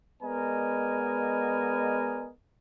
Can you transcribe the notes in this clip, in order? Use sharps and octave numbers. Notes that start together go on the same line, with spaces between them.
G#3 B3 A#4 D5 D#5 G#5